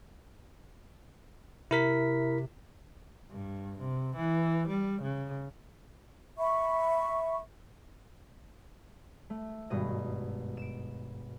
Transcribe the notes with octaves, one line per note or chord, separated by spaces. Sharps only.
C3 E4 A#4 B6
G2
C3
E3
G3
C#3
E5 B5 C#6
A3
G#1 G2 B2 D#5
D7 E7